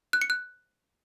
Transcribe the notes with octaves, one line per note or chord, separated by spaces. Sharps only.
F#6
C#7
F#6